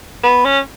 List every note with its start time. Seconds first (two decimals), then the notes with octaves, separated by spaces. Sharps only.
0.23 B3
0.45 C#4